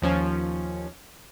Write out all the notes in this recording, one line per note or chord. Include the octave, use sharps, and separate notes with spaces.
D#2 F3 C#4